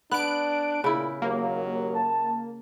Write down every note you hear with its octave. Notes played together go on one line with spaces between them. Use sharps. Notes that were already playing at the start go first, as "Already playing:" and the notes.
B3 D4 F#6 D7
A#2 C#3 E4
D#2 F#3 A#3
A5